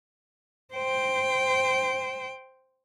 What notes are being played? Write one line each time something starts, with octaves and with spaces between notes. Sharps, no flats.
C5 G5